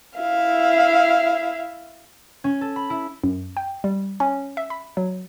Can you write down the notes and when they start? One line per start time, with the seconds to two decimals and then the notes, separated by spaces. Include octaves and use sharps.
0.18 E4 E5 F5
2.44 C#4
2.61 A4
2.76 B5
2.90 E4
3.24 F#2
3.57 G5
3.84 G3
4.20 C#4
4.57 E5
4.70 B5
4.97 F#3